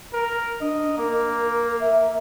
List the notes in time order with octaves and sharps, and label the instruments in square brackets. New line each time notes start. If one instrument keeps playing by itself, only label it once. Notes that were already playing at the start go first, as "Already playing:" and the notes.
[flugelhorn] A#4
[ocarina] D4 [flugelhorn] D#5
[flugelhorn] A#3 [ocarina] A#4
[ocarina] E5